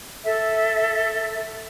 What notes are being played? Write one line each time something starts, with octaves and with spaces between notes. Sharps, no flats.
A4 E5